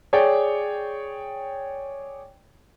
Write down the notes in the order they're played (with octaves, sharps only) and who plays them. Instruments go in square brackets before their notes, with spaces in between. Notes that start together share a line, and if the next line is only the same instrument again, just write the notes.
[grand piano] G#4 C#5 D5 G5